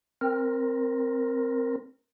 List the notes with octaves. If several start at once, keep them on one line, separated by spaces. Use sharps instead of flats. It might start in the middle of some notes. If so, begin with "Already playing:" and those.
C4 A#4